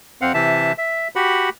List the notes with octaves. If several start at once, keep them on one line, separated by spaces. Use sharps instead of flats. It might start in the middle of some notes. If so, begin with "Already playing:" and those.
F2 C4 F5 F#5
C3 E3 E5 A5
E5
F#4 G4 F#5 B5